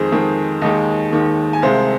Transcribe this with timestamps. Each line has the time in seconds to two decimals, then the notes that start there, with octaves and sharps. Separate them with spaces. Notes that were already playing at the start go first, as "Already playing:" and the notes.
Already playing: F2 D#3 G#3 G#4 C5
0.12 F2 D#3 G#3
0.62 D#2 D#3 G#3 D#4
1.12 D#2 D#3 G#3
1.53 G#5
1.62 C2 C3 G#3 C5 F5